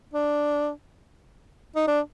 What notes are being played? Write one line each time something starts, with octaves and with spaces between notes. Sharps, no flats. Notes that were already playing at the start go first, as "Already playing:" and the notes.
D4
D#4
D4